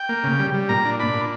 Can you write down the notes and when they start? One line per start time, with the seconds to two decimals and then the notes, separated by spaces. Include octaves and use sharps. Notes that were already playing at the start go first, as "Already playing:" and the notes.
Already playing: G5
0.09 A#3
0.24 C#3
0.39 G3
0.54 G3
0.69 A#2 A#5
0.85 D4
1.00 D4 B5
1.14 A#2